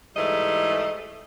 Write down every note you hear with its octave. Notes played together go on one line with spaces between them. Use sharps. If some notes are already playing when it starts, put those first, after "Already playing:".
G#2 E3 G3 A3 D#5